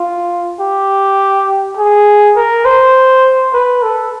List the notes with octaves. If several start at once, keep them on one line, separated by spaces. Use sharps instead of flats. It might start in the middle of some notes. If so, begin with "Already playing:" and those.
Already playing: F4
G4
G#4
A#4
C5
B4
A4